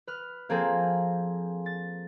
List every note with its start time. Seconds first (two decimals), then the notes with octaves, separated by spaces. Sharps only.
0.07 B4 F6
0.49 F3 A#3 C4 G#4 A4
1.66 A6